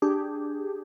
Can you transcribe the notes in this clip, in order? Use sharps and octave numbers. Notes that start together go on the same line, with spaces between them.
D4 G4 G#4